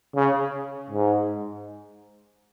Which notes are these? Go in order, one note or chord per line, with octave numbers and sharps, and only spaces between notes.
C#3
G#2